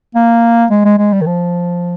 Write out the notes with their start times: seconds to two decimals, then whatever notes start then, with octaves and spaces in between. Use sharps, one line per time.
0.15 A#3
0.71 G#3
0.85 G#3
0.98 G#3
1.13 G3
1.21 D#3
1.26 F3